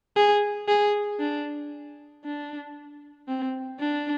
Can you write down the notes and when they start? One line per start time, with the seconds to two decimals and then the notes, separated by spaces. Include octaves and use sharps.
0.16 G#4
0.68 G#4
1.20 D4
2.24 D4
3.28 C4
3.80 D4